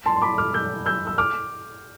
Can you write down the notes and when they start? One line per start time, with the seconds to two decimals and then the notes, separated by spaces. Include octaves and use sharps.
0.06 A5 C6
0.16 C6
0.22 B5 D6
0.38 D6 F6
0.53 E6 G6
0.86 E6 G6
1.07 E6
1.18 D6 F6